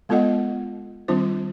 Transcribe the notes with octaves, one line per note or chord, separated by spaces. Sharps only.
G#3 B3 F4 A4 D#5 F#5
D#3 G3 C4 D4 F4 C5